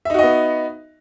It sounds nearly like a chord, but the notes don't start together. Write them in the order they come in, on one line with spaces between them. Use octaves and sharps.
E5 D#4 F#4 D#5 B3